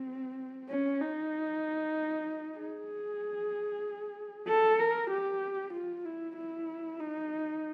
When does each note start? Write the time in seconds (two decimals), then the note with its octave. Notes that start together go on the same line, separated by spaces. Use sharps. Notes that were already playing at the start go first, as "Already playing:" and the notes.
Already playing: C4
0.69 C#4
1.01 D#4
2.58 G#4
4.47 A4
4.79 A#4
5.10 G4
5.73 F4
6.05 E4
6.36 E4
7.00 D#4